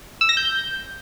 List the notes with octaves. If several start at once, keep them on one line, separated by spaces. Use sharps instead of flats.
E6
A#6
G6